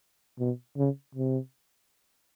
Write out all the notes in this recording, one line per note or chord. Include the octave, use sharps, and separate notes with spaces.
B2
C#3
C3